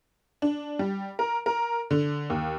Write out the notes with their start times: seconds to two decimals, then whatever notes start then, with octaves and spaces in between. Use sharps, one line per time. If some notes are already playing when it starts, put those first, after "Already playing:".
0.42 D4
0.79 G3
1.19 A#4
1.46 A#4
1.91 D3
2.30 D#2